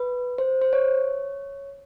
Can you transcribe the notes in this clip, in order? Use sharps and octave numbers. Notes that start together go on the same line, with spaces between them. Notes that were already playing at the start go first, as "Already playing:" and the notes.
Already playing: B4
C5
C5
C#5